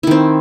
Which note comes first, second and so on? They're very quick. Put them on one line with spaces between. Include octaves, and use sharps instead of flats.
E4 D#3 C4